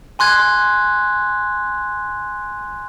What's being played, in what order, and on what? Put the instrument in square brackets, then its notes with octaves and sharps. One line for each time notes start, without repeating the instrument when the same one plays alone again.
[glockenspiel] G#5 C6 F#6 G#6